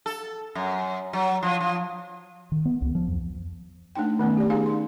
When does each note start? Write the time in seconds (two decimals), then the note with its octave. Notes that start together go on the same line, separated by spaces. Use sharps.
0.06 A4
0.55 F#2
1.13 F#3
1.43 F3
1.60 F3
2.52 D#3
2.65 B3
2.82 C#2
2.95 F3
3.08 F2
3.95 A3 D4 D#4 G5
4.19 D#3 A3 B3 C#4
4.37 G4 D5
4.50 C#4 D#4 G#4 F5 G#5
4.66 D#4 C6